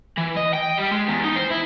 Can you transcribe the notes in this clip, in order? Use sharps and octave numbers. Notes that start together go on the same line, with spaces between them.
E3
D#5
G5
G3
G#3
E2
D#4
C5
E4